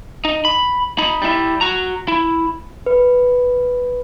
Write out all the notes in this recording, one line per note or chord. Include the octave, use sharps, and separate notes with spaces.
D#4
B5
D#4 B5
G3 E4
F#4 A#5
E4
B4